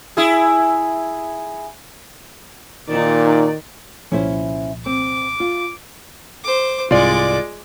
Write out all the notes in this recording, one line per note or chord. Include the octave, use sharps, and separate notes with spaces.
E4 G#4
A#2 D#3 D#4 D5
C2 A#2 F3 C#4 E4 C5
C4 D6
F4
C5 D6
C2 G#2 G#3 F4 D5 D6